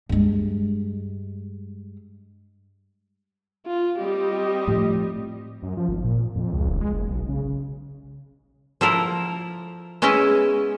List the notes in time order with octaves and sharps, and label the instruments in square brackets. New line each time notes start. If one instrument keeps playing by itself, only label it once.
[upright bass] G2 G#3
[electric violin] F4
[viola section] G3 C4 D#5 [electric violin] G4
[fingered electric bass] A2 F3
[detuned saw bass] F#2
F3
G#1
A#2
F2
C#2
D#1
G#3
F#1
B1
C#3
[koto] F3 A#3 E4 A4 A#4
G#3 B3 C#4 E4 D#5 E5